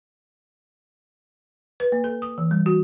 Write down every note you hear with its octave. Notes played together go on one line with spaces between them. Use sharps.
B4
A#3
A4
D#6
E3
G3
F#4